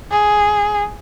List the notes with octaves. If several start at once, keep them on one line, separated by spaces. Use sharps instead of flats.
G#4